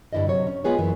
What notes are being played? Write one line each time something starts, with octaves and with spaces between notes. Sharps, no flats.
G2 D3 E4 D5 D#5
C3 F#3 C#5
C#4
G#3 B3 F4 G#4 B4 C#5
F#2 E3